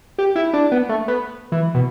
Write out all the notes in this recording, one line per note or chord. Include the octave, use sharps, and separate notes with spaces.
G4
E4
D4
B3
A3
B3
E3
B2